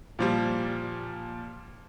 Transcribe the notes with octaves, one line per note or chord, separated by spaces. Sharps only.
A#2 F3 G3